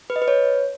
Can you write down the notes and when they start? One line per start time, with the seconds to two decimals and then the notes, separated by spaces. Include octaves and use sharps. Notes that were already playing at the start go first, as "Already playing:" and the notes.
0.10 B4
0.16 D#5
0.22 B4
0.28 C#5